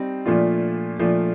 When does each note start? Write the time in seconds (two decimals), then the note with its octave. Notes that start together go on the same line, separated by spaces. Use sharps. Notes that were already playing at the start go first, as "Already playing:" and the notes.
Already playing: G3 C4 D#4
0.26 A#2 F3 A3 D4 F4
0.99 A#2 F3 A3 D4 F4